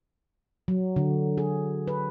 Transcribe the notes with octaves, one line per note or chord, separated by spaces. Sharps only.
F#3
D3
G#4
B4